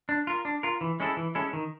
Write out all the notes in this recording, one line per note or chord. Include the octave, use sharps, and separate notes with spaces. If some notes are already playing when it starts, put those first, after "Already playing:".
D4
F4 A#4
D4
F4 A#4
E3
G#3 C#4 E4 A4
E3
G#3 C#4 E4 A4
D#3